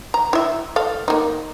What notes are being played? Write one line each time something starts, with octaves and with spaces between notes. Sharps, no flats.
A#5
E4 E5
A4 F5
A#3 D#4